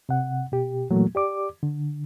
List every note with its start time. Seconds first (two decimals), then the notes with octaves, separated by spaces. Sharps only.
0.09 C3 F#5
0.52 B2 G4
0.90 A#2 E3 F#3 A3 A#3
1.15 G4 D5 D6
1.63 D3